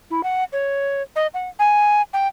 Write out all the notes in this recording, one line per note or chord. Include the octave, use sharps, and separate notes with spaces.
E4
F#5
C#5
D#5
F#5
G#5
G5